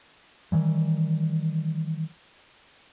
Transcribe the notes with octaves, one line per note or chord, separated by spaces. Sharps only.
D#3 E3 G3